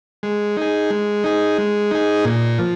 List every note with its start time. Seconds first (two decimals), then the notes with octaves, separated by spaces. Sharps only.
0.23 G#3
0.57 D#4 G#4
0.90 G#3
1.24 D#4 G#4
1.58 G#3
1.91 D#4 G#4
2.25 A#2
2.58 F3